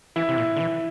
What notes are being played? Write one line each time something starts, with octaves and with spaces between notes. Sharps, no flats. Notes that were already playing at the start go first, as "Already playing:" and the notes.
E3 E4
C3
A#2
D3
E3